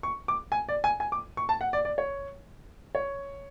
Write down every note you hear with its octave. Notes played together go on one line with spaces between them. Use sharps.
C#6
D6
G#5
D5
G#5
G#5
D6
C#6
A5
F#5
D5
D5
C#5
C#5